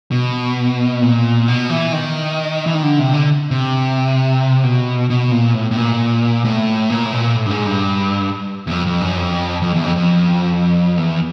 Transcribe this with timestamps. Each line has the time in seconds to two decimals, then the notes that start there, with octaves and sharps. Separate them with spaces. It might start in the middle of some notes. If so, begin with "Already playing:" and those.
0.11 B2
1.02 A#2
1.48 B2
1.70 E3
1.92 D#3
2.66 E3
2.74 D#3
2.83 D3
2.99 C3
3.13 D3
3.51 C3
4.64 B2
5.10 B2
5.31 A#2
5.54 A2
5.71 A2
5.77 A#2
6.45 A2
6.90 A#2
7.05 A2
7.13 A#2
7.35 A2
7.46 G2
7.50 G#2
7.66 G2
8.67 E2
8.71 F2
8.86 F2
9.01 F#2
9.17 F2
9.62 F2
9.74 E2
9.84 F2
9.96 F2
10.97 E2